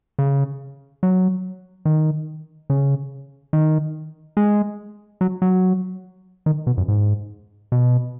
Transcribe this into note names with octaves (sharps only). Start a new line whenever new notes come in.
C#3
F#3
D#3
C#3
D#3
G#3
F#3
F#3
D#3
B2
F#2
G#2
B2